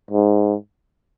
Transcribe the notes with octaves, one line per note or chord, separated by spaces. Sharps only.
G#2